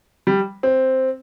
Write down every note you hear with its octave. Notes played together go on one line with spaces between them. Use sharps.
G3
C4